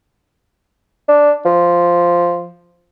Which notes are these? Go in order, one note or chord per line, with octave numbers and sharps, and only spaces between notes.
D4
F3